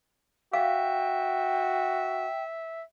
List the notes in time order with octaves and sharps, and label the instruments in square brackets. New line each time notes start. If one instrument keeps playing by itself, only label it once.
[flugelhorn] F#4 [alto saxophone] E5 [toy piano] F5 [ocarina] G5